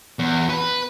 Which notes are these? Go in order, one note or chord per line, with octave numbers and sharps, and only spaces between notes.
E2
B4